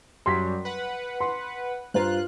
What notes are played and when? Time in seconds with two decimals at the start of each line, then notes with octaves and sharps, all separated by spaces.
0.26 F#2 F#3 G3 C6 B6
0.65 B4 F#5
1.21 C6
1.94 G2 F4 C5 A#5 F#6